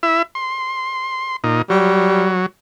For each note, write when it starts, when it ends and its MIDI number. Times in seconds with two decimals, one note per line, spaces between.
0.03 0.22 64
0.03 0.22 76
0.35 1.36 84
1.44 1.62 46
1.44 1.62 63
1.70 2.46 54
1.70 2.34 55